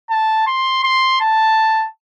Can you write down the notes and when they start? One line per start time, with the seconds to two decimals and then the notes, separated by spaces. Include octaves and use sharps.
0.10 A5
0.47 C6
0.84 C6
1.21 A5